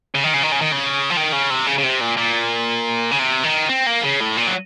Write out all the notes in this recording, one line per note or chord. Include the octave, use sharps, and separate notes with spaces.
C#3
D#3
C#3
D#3
C#3
D#3
C#3
F3
D#3
C#3
C3
C#3
C#3
C3
A#2
A#2
C#3
C3
D#3
C4
A#3
C#3
A2
A#2
F#3